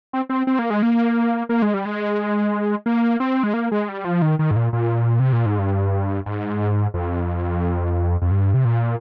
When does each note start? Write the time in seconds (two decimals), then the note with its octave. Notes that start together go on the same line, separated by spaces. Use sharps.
0.13 C4
0.29 C4
0.47 C4
0.59 A#3
0.70 G#3
0.83 A#3
1.49 A#3
1.62 G#3
1.74 G3
1.85 G#3
2.86 A#3
3.20 C4
3.43 G#3
3.54 A#3
3.72 G#3
3.89 G3
4.05 F3
4.22 D#3
4.39 D#3
4.51 G#2
4.56 A#2
4.73 A#2
5.20 C3
5.33 A#2
5.46 G#2
5.59 G2
6.26 G#2
6.94 F2
8.22 F2
8.31 G2
8.54 C3
8.65 A#2